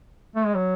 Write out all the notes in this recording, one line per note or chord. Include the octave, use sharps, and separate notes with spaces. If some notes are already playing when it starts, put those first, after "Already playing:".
A3
G#3
F#3